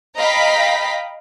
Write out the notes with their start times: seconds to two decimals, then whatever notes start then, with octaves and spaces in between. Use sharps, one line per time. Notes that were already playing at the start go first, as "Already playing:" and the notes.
0.17 D#5 F5 G5 A#5 B5 B6